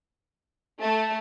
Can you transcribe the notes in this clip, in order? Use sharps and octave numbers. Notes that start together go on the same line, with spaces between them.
A3 A5